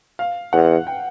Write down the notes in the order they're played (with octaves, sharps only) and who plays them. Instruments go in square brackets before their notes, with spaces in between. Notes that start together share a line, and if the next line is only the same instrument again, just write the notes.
[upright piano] F5
[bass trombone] E2 [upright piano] F#5
[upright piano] G5